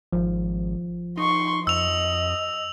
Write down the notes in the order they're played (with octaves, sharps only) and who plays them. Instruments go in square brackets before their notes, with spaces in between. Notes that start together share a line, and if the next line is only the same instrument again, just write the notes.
[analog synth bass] G#1 [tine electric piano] F3
[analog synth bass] D#4 [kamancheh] C6 C#6
[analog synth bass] F2 [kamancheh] D#5 [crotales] E6 F7